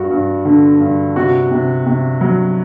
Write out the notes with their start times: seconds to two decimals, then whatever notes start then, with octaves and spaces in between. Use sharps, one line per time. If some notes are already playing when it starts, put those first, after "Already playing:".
Already playing: G2 F#4
0.10 G2
0.45 D3
0.81 G2
1.16 C3 F#4
1.51 C3
1.86 C3
2.21 F#3